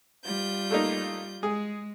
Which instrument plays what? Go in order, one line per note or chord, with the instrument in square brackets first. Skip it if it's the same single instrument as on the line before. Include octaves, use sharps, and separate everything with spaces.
[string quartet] G3 F4 G6
[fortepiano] A3 A#3 D#4
[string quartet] G#3 [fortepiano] G#4